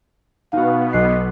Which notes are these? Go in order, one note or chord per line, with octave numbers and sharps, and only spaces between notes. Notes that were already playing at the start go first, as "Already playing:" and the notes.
B2 B3 D#4 F#4 F5
B1 D#5 F#6 C7